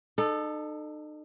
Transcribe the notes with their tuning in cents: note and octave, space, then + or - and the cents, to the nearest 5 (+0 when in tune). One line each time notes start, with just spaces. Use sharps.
D#4 -40 A4 +0